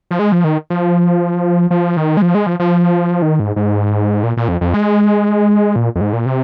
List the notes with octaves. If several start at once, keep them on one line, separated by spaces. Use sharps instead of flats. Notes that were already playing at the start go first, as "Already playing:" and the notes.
F3
G#3
F3
D#3
F3
F3
D#3
G#3
F3
G#3
F3
F3
D#3
G#2
G#2
A#2
A#2
F2
F2
G#3
A#2
F2
G#2
A#2
C3